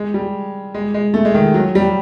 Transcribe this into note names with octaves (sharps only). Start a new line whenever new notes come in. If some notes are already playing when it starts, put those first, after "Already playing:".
Already playing: G#3
G3
G#3
G#3
A3
G#3
D#3
F#3
G3